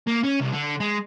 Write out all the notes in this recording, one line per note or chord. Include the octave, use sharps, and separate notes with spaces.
A#3
C#4
C2
D3
G#3